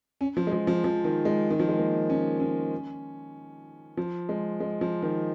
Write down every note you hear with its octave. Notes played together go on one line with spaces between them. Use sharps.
C#4
F3
G#3
F3
F3
F3
D#3
G#3
D#3
F3
G#3
A#3
C#4
C#4
F3
G#3
G#3
F3
D#3